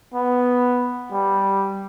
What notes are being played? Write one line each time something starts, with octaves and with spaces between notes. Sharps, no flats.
B3
G3